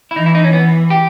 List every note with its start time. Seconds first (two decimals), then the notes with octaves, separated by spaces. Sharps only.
0.11 E4
0.16 E3 D#4
0.26 E4
0.35 D#4
0.44 C#4
0.53 B3
0.90 G4